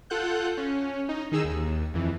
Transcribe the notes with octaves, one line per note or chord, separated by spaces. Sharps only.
F4 A4 F#5 F#6 G6
C#4
D#4
D#3 D#4 G#4 E6
D#2
F2 E3